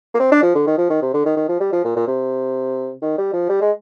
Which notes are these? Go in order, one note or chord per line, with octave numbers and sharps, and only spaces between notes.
A#3
C4
D4
F3
D3
D#3
F3
D#3
C3
D3
D#3
D#3
F3
G3
F3
A#2
A#2
C3
D#3
G3
F3
G3
G#3